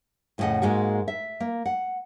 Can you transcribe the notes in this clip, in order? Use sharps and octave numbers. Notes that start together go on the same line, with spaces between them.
F2 A2 C#3 C#4 D#5 F#5
G#2 G#3 A#3 F#4
E5
A#3
F#5